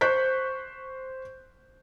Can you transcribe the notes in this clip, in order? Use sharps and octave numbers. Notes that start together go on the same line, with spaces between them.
C5 C#6 F#6 G6 B6